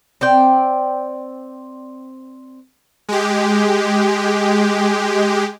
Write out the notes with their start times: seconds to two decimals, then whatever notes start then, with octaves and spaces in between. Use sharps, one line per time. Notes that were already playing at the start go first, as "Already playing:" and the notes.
0.21 C4 D5 G5
3.09 G#3 G4